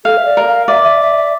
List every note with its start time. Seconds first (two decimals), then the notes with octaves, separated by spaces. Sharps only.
0.05 A4 F5
0.17 E5
0.25 D5
0.37 A#4
0.48 F5
0.68 D5 E5
0.84 E5
1.01 E5
1.17 E5